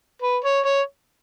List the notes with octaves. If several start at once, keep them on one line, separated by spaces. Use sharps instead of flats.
B4
C#5
C#5